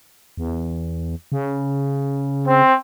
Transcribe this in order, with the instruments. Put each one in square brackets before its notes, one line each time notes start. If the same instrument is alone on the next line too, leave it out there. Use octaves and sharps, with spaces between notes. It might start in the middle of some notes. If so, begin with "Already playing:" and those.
[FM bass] E2
C#3
[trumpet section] C4